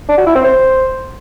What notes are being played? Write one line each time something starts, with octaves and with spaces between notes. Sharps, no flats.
D4
F#4
E4
C4
C5